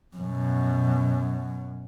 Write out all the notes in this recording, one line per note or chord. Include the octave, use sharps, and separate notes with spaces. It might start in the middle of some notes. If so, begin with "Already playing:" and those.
F#2 B2